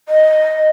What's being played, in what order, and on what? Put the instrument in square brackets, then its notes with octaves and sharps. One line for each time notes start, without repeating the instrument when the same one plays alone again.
[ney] D#5